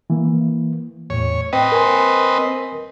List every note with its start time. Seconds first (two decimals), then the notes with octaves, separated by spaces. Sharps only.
0.10 E3 A#3
1.10 E2 A2 C#5
1.53 C4 B4 D#5 G5
1.72 A#4 G#5 C6